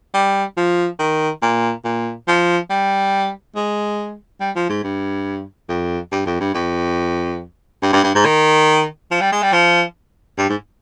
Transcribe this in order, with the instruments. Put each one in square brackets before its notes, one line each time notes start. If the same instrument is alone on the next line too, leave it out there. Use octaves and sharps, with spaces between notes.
[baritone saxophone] G3
F3
D#3
A#2
A#2
F3
G3
G#3
G3
F3
G#2
G2
F2
G2
F2
G2
F2
G2
G2
G2
G#2
D#3
F3
G3
G#3
G3
F3
G2
G#2